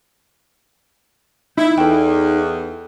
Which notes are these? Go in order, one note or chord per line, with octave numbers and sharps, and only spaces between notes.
D#4 E4
E2 A4 G5